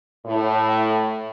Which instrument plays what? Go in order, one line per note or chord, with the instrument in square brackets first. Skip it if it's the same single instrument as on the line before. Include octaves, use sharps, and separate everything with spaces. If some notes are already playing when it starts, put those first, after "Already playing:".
[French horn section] A2